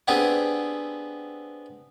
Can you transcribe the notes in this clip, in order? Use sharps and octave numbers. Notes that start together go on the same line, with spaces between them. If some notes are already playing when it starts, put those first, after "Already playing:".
B3 C4 D4 G4 G#4